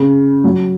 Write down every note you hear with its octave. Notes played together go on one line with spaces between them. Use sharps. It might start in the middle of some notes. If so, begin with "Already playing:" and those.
Already playing: C#3
F#3